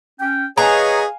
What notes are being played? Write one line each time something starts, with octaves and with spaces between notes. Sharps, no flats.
C#4 G5
G#4 B4 C#5 D#5 F5 G#5 A#5